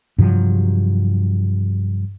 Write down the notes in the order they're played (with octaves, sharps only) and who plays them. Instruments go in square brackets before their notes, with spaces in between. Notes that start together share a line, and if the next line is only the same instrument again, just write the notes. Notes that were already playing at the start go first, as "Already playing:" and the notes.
[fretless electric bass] G2 C3 F3 F#3